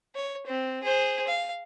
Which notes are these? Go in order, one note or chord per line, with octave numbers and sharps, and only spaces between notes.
C#5
C4
G#4 C5
F5